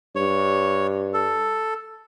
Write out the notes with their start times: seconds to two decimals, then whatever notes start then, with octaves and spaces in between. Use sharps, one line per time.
0.16 G2 C#5
1.14 A4